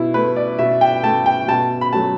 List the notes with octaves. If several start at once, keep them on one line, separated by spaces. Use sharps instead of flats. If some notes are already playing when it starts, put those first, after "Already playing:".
Already playing: B2 E4
A3 B4
D5
B2 E5
G5
A3 A5
G5
B2 A5
B5
F#3 A3 A5